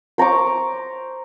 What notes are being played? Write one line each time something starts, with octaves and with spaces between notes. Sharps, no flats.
C5 A#5 C#6 D6